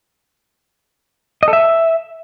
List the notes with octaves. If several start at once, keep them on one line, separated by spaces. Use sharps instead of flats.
D#5
A4
E5